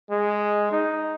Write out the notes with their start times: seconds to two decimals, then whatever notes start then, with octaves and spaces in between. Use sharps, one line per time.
0.10 G#3
0.72 D#4